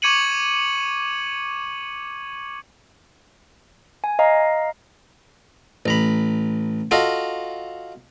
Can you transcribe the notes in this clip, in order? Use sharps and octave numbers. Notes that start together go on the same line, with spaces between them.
C#6 D6 G#6 C#7 D#7 F#7
G#5
D#5 F5 A#5
A1 A#5 B5
F4 F#4 A4 D#5 F5